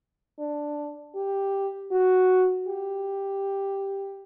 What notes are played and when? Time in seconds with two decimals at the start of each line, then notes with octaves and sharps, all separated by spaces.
0.39 D4
1.16 G4
1.92 F#4
2.68 G4